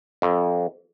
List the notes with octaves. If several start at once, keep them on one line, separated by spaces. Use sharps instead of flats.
F2